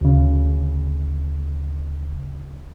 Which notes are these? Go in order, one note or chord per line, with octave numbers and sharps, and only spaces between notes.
D2 C#3